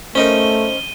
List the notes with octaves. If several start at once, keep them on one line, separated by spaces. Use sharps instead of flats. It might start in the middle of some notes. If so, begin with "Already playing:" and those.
A3 C#4 D#4 A#4 C5 D#7 G7